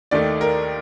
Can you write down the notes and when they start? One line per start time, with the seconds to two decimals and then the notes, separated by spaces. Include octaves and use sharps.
0.11 D#2 D#3 A3 D#4 D5
0.41 A#4